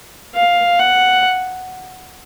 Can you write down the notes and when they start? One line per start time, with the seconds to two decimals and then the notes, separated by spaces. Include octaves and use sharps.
0.35 F5
0.79 F#5